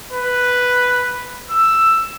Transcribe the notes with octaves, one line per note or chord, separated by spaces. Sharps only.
B4
E6